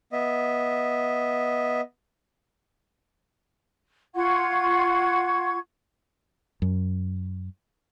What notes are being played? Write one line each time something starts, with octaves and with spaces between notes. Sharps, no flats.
B3 D#5 E5
F4 F#5 C#6 G#6
F#2